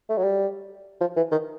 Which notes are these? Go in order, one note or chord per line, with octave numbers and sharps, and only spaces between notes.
A3
F#3
G3
F3
E3
D#3